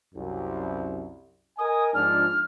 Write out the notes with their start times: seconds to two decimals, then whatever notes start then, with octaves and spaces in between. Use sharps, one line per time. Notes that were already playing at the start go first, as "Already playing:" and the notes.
0.15 C2 F#2
1.58 A#4 D#5 G#5 D#6
1.94 G#2 F3 D4 F6